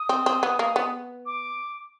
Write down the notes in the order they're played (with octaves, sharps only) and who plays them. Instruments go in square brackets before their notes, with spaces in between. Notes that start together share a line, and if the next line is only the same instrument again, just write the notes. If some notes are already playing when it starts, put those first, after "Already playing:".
Already playing: [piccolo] D#6
[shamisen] C4
C4
B3
A#3
B3
[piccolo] D6